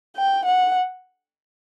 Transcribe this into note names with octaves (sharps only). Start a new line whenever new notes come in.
G5
F#5